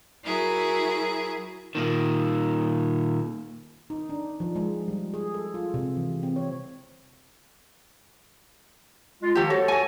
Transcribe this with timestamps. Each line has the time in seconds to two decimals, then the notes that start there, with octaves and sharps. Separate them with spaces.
0.23 F#3 E4 F#4 G#4 A#4
1.75 A#2 D#3
3.90 D#4
4.09 D4
4.40 F3
4.56 G#3
4.88 G3
5.14 G#4
5.34 A4
5.54 F4
5.74 C3
5.97 E3
6.23 C4
6.36 C#5
9.23 G#3 F4
9.35 D#3 F3 A#3 G4 A4
9.50 F#4 A4 C#5
9.68 F#4 G#5